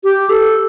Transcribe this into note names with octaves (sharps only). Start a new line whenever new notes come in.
G4
A4